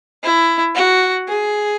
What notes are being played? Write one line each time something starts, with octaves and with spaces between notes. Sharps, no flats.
E4
F#4
G#4